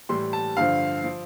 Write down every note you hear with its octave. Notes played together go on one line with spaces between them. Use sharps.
A2 E3 G3 C6
A5
G2 D3 F3 F5
F3